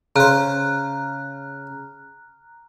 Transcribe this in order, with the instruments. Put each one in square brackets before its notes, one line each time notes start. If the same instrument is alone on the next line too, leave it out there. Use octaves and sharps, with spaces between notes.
[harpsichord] C#3 C5 [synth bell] A#5 F6 F#6